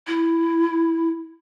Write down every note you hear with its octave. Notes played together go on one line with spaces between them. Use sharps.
E4